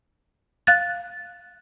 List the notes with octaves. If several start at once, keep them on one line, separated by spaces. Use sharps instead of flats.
F5 F#6 A6